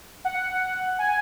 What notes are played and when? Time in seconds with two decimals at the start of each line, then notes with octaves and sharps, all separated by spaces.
0.25 F#5
0.99 G#5